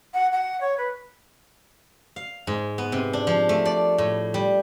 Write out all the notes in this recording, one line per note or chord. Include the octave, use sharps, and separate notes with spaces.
F#5
F#5
C#5
B4
F5
G#2
B3
C3
D4
F3
A3
D5
A2
G3